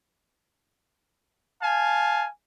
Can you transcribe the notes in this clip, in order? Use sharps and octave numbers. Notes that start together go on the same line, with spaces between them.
F5 G#5 A5